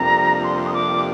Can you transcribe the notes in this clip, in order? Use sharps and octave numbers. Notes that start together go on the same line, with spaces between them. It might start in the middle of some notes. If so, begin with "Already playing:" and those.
Already playing: F2 C3 G3 A#3 D4 A#5
C6
D#6
D6